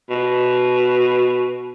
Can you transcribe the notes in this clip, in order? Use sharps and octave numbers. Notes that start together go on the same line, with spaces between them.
B2